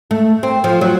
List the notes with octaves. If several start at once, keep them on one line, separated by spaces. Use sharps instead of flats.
A3
C4
F3
F#3